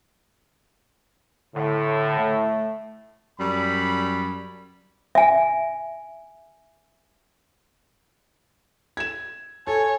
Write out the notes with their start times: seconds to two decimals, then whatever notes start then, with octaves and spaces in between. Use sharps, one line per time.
1.55 A2 D3
2.19 A3
3.39 F#2 G3 B5
5.15 E5 G#5
8.97 G#6 E7
9.67 A4 C#5 G#5